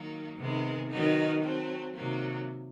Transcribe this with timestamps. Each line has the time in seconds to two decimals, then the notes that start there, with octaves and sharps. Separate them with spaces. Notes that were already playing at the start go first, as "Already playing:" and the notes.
Already playing: D#3 F#3 A#3
0.38 C3 D#3 G#3 B3
0.90 D#3 F#3 B3 D#4
1.42 F#3 A3 C4
1.94 C3 D#3 F#3 A#3